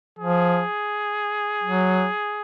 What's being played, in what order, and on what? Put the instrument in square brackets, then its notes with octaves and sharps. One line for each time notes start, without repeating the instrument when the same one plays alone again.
[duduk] F3 [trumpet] G#4
[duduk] F#3